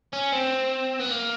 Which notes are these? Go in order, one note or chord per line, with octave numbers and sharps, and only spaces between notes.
C#4
C4
B3
A#3